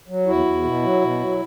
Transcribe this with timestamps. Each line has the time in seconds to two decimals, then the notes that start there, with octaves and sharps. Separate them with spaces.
0.08 F#3
0.27 E2 E4 F#4
0.45 E2
0.64 B2
0.82 F#3
1.01 B2
1.20 F#3